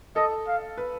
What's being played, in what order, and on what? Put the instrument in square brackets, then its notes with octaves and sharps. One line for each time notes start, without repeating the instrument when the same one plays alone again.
[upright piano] A4 [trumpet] D#5
[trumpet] F5
[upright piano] B4